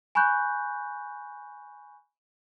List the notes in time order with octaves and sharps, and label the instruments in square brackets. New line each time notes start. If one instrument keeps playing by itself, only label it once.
[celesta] G#5 B5 C#6 F#6 G6